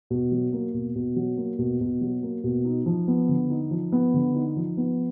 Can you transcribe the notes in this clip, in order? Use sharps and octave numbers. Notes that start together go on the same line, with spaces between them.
B2
F#3
A#3
B2
B2
F#3
A#3
B2
B2
F#3
A#3
B2
D#4
F3
B3
D3
D#4
F3
B3
D3
D#4
F3
B3